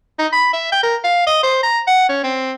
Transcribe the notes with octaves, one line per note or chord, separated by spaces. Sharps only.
D#4
B5
E5
G5
A#4
F5
D#5
C5
A#5
F#5
C#4
C4